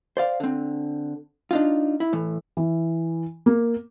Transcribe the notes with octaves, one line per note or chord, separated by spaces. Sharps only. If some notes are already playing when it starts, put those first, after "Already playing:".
C5 D5 F5
D3 C4
D4 D#4 F4
E4
A2 E3
E3
A#3